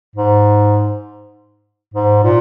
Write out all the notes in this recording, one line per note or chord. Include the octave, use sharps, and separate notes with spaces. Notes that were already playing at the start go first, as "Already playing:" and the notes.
G#2
G#2
A#2